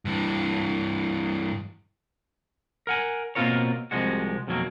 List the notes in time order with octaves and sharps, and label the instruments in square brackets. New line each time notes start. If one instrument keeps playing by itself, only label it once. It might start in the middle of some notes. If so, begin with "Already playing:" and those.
[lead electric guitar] G2 E3
[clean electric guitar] A#4 F#5 G#5
B2 A#3 C4 F4 A#4 C#5
C2 C3 F3 G#3 F#4
F2 B2 D#3 F#3 A#3